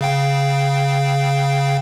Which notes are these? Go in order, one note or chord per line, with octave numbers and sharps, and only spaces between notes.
C#3 F5 G5